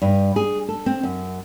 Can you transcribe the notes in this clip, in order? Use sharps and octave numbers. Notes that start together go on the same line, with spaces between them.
G2
G#4
A4
C4
F#2